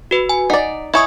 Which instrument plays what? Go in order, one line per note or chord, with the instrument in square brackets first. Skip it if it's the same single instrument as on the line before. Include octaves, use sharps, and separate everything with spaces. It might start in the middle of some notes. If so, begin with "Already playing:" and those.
[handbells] F#4 B4
G#5
[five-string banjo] D#4 D5 [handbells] F#5
[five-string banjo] E4 C#5 [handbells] D#5 G#5 D#6